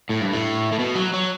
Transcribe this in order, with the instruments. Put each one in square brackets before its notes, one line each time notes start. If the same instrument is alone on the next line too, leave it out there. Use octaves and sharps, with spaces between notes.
[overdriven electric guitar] A2
G2
A2
A2
B2
F#3
F#3